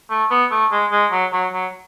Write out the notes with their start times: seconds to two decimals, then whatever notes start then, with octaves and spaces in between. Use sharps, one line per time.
0.10 A3
0.31 B3
0.51 A3
0.71 G#3
0.91 G#3
1.12 F#3
1.32 F#3
1.53 F#3